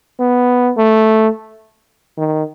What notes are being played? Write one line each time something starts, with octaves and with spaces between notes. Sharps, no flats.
B3
A3
D#3